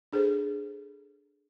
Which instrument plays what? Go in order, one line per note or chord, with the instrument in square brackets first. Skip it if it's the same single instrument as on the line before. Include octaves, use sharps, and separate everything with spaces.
[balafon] D4 G#4 A4 C5